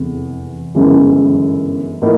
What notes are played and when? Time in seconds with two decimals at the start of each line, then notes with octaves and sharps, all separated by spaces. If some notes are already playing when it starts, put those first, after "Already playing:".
Already playing: F1 E2 C3
0.75 G1 F#2 C#3 E3 G#3
2.02 A2 F3 A#3 D#4